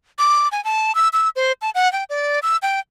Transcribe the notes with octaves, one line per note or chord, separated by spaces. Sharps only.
D6
G#5
A5
E6
E6
C5
A5
F#5
G5
D5
E6
G5